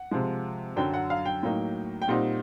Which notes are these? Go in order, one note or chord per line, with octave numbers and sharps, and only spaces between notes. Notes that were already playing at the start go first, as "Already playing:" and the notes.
Already playing: F#5
C3 F3 G#3
F#2 D3 F#3 G5
F#5
F5
G5
A2 F#3 A#3 D#4
G5
A#2 G3 C4 D#4 F#5